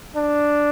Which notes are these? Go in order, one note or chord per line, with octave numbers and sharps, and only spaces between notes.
D4